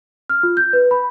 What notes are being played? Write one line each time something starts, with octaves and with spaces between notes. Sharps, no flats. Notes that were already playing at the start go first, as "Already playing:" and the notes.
F6
F4
G6
B4
B5